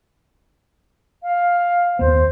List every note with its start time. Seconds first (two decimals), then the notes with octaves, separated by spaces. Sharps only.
1.23 F5
1.99 D#2 B3 C5